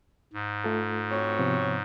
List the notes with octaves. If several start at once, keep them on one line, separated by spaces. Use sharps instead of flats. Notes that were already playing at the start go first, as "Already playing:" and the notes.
G#2
A3 F4 A4
C4 F#4 C#5
C3 F3 B3